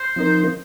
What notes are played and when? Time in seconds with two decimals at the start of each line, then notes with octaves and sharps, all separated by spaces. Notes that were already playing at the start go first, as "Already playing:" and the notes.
Already playing: C5
0.16 F3 C4 D#4 A#4